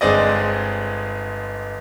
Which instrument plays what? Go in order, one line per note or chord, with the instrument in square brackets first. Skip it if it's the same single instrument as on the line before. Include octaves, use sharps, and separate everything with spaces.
[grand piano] G1 G#3 C4 G#4 D5 D#5